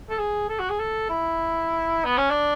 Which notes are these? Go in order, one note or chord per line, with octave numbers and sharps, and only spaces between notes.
A4
G#4
A4
F#4
G#4
A4
E4
B3
C#4
D4